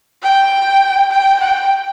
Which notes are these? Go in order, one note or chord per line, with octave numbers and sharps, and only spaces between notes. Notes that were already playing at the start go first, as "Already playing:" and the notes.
G5
G5
G5